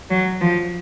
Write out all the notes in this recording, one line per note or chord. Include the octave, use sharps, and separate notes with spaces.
F#3
F3